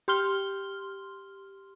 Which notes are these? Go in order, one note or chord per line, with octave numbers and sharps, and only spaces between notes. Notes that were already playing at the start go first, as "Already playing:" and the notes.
G4 C6 F6 G7